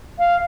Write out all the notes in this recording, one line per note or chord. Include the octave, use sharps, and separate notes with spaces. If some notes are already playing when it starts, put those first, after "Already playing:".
F5